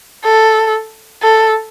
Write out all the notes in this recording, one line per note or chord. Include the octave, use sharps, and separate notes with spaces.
A4
A4